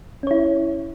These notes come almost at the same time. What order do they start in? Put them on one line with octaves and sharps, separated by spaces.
C#4 C#5 E4